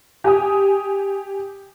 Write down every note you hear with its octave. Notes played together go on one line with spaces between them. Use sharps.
G4 G#5 D#6